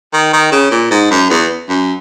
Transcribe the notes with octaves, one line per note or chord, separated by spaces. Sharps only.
D#3
D#3
C#3
A#2
G#2
F#2
E2
F#2